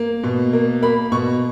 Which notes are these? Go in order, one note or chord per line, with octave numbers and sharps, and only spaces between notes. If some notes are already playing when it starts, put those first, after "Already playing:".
Already playing: A#3
B2
A#3
A#3 B5
B2 C#6